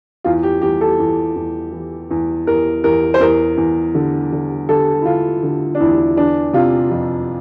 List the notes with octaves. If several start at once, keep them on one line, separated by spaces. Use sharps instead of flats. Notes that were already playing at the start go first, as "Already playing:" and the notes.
E2 F4
G4
E2 G4
A4
E2
E2
E3
E2
E2 A#4
E2 A#4
C5
E2 A#4
E2
D3
D3
D3 A4
E4
D3 F4
D3
D4
E2 E4
E3 D4
C3 F4
F2